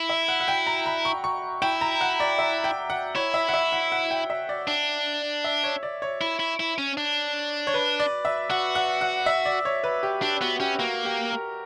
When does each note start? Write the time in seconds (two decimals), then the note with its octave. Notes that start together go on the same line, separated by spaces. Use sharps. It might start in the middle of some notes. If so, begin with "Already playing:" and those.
Already playing: E4
0.10 E5
0.28 F#5
0.40 F#5
0.48 G5
0.67 A#5
0.86 B5
1.05 C#6
1.24 C#6
1.62 E4 G5
1.81 A#5
2.01 F#5
2.20 D5
2.39 E5
2.64 G5
2.90 F#5
3.15 E4 C#5
3.34 E5
3.49 F#5
3.54 E5
3.72 F#5
3.92 F#5
4.11 G5
4.30 E5
4.49 D5
4.67 D4
5.44 E5
5.64 C#5
5.83 D5
6.02 C#5
6.21 E4
6.40 E4
6.60 E4
6.78 C#4
6.97 D4
7.67 C#5
7.74 B4
8.00 D5
8.25 E5
8.50 F#4 F#5
8.75 F#5
9.01 F#5
9.26 E5
9.45 D5
9.65 C#5
9.84 B4
10.03 G4
10.22 D4 G4
10.41 B3 F#4
10.60 C#4 G4
10.79 A#3 F#4
11.05 G4
11.31 A#4